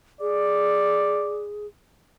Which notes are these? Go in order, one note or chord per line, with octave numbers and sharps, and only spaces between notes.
G#4 D5